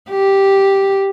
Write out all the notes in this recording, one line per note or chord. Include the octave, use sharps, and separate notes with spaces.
G4